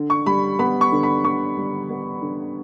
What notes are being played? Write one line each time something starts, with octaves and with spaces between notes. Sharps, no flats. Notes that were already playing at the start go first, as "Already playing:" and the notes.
Already playing: D3
C#6
G3 B5
B3 B5
C#6
D3
B5
D3 C#6
G3
B3
D3